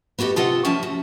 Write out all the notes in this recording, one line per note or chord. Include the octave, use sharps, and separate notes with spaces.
B3 F#4 G4 A4 D#5
C3 F4 A4 D#5 F#5
F3 C#4 E5 A5
F#4